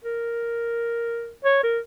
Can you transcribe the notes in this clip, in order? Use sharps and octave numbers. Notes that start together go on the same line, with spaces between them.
A#4
C#5
A#4